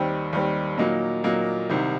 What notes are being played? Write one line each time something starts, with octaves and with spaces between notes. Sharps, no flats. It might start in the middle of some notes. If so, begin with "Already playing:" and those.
Already playing: D#2 D#3 G3 C4
D#2 D#3 G3 C4
A#2 F#3 A#3 D#4
A#2 F#3 A#3 D#4
C2 C3 D#3